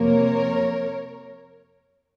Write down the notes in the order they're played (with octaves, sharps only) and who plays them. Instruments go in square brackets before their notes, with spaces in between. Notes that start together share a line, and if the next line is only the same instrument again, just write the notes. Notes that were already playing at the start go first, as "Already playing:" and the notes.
Already playing: [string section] F2 C3 F3 A#3 A#4 C#5